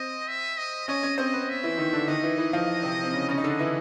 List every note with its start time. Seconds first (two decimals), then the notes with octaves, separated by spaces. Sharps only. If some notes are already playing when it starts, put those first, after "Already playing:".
Already playing: C4 C5 D#5
0.28 E5
0.58 D#5
0.88 C#4 C#5 D#5
1.03 C#4 C#5
1.18 C4 C5 D#5
1.33 B3 B4
1.49 E5
1.63 E3 E4
1.78 D#3 D#4
1.93 D3 D4
2.08 D#3 D#4 D#5
2.23 E3 E4
2.38 E3 E4
2.53 F3 F4
2.83 C3 C4
3.04 C4
3.13 C#3 C#4
3.28 C#3 C#4 D#5
3.38 D#4
3.44 D3 D4
3.59 E3 E4